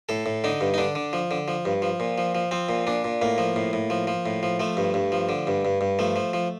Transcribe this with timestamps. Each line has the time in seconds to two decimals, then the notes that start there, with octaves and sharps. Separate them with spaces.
0.09 A2 A4
0.26 A2
0.44 D3 D#4
0.61 G2
0.74 D#4
0.78 D3 D4
0.95 D3
1.13 F3
1.31 D3
1.48 F3
1.65 G2
1.82 F3
2.00 A#2
2.18 F3
2.35 F3
2.51 F3 C4
2.69 A#2
2.87 A#2 D4
3.04 A#2
3.22 A2 A#3
3.38 F3
3.56 A2
3.73 A2
3.90 F3
4.07 F3
4.26 A2
4.43 F3
4.60 F3 A3
4.77 G2
4.94 G2
5.12 F3
5.29 D3
5.47 G2
5.65 G2
5.81 G2
5.99 F3 A3
6.16 F3
6.33 F3